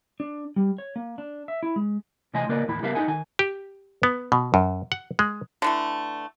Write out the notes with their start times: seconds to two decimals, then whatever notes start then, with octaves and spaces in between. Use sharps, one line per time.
0.20 D4
0.56 G3
0.78 C#5
0.96 A#3
1.18 D4
1.48 E5
1.63 E4
1.76 G#3
2.34 C3 E3 A3 D#5 G#5 C6
2.49 C#3 A#3 A#4 B4 D5 D#5
2.68 D#2 A2 E3 E4 B5
2.82 C#3 G3 B3 A#4 E5 F5
2.95 D#4 A4 D#5 F#5 G#5
3.08 D#3 G#5
3.39 G4
4.03 B3
4.32 B2
4.54 F#2
4.92 F#5
5.19 G#3
5.62 D3 E3 A3